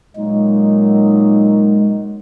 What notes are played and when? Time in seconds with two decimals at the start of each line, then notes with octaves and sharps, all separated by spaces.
0.16 A#2 F#3 G#3 A#3 D#4